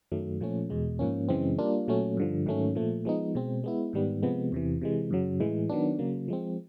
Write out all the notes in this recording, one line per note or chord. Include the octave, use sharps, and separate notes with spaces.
F#2 D#3 F#3 A3
A#2 F3 A3 C#4
E2 B2 G#3
G#2 F3 A#3 C#4
F#2 C#3 E3 G#3 C4
G3 A#3 D4 F4
A#2 F#3 A3 C#4
G2 D3 F3
G#2 D#3 F#3 A3 C#4
A#2 F3 A3
F3 G#3 B3 D#4
B2 G#3 C4
G#3 B3 E4
G#2 D#3 G3 B3
C3 F3 G#3 B3
E2 C3 E3
C3 E3 G#3
F#2 C#3 F#3
A2 E3 G#3
D#3 F#3 B3 D4
C#3 F#3 A#3
F3 G#3 C4